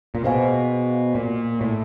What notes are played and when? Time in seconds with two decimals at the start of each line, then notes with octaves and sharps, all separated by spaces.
0.15 A#2
0.24 B2 G#4 C5 F5 G#5
1.15 A#2
1.61 A2